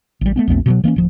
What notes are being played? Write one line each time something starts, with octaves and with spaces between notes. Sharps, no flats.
A1 G3
A3 B3 C#4
A#1 E2 A3 C4
B2 F3 F#3
E3 A#3 B3 C#4
D1 F3